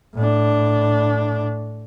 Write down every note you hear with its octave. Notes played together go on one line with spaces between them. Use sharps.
A2 D4